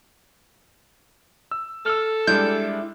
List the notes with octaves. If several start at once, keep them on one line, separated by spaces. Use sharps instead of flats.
E6
A4 E6 F6
G3 G#3 D4 E4 D5 G6